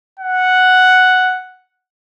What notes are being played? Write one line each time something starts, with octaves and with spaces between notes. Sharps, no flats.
F#5